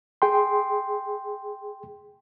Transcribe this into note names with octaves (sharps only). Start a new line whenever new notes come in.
G#4 G5 C6